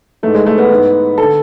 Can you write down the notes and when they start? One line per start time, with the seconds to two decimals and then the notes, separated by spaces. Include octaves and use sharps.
0.23 G#2 E3 A3
0.35 G#3
0.46 A3
0.58 B3
0.71 G#2 E3
1.18 A4
1.22 D3